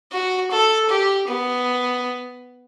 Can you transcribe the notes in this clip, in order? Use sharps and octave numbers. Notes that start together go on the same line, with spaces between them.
F#4
A4
G4
B3